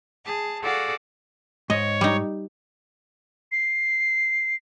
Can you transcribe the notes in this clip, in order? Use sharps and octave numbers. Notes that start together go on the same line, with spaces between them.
G#4 A5
F#4 G#4 A4 D5 F5 F#5
G#2 C#5 D#5
G3 D#4
C7